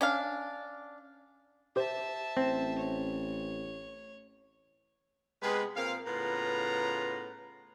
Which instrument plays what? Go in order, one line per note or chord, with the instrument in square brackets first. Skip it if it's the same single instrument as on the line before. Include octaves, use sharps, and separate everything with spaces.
[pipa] C#4 D4 F5
[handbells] G4 C5 [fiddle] E5 A5
[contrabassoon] A1 [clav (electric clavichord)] C4
[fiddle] C#5
[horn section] C3 G#3 B3 G#4 B4
A#2 C4 A#4 F5
A2 C#3 B3 F4 B4 A#5